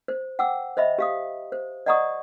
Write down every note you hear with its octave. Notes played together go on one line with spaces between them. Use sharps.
C5
F#5 G5 D6 E6
C5 D#5 E5 B5
G4 F5 D#6
C5
D5 D#5 F#5 A#5 C#6 D#6